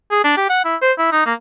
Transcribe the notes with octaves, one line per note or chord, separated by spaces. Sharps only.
G#4
D4
G4
F#5
E4
C5
E4
D#4
A#3